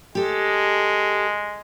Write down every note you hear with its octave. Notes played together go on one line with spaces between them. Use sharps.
G#3 G4 A4